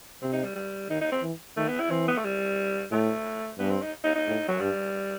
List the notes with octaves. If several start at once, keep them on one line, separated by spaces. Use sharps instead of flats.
C3 C4
D#4
G3
G3
D#3 D#4
D#4
C4
E3
D#3 A3
B3
E4
E3 C4
B3
A3
G3
A2 A3
G2 B3
C4
D#4
D#4
D#4
A2
F#3
G2 G3